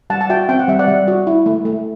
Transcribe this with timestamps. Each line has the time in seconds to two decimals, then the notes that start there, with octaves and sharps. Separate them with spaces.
0.10 G3 F#5 A5
0.21 A5
0.30 F#4 E5 G5
0.49 C4 G5
0.59 F#5
0.68 G3 E5
0.79 D5 F#5
0.88 G3
1.08 F#4
1.27 E4
1.46 A3
1.65 A3